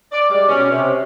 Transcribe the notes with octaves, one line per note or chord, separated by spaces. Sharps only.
D5
G3 G#3 D5
B2 C#4
C3